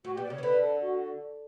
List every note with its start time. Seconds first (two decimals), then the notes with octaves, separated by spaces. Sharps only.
0.04 A2 F#4
0.14 G4
0.17 B2
0.23 D5
0.30 C#3 C#5
0.38 E3
0.43 D3 B4
0.62 A4
0.81 F#4